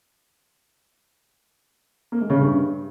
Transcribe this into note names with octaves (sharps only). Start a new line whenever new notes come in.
A#3
G#3
C#3
G2